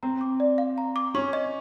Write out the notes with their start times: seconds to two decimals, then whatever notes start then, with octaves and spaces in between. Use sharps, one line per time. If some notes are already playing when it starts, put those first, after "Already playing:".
0.03 C4 A#5
0.21 D6
0.40 D5
0.58 F5
0.78 A#5
0.96 D6
1.14 C#4 C#6
1.33 D#5